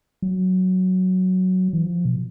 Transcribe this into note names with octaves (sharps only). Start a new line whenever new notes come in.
F#3
E3
F3
B2